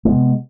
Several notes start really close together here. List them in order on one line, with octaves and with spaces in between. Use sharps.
G#3 B3 C3